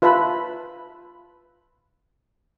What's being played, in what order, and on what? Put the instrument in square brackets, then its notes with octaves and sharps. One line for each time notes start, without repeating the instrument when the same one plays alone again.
[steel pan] F4 B4 E5 A5 B5